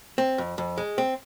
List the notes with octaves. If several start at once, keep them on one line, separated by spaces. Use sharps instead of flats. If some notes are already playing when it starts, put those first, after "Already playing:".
C4
F2
F2
G#3
C4